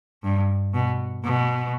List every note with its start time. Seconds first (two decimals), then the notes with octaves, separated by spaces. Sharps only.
0.24 G2
0.74 B2
1.24 B2